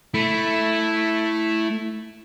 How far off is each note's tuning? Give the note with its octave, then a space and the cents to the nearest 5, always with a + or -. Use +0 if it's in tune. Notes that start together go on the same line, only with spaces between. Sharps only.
A3 +0 E4 +0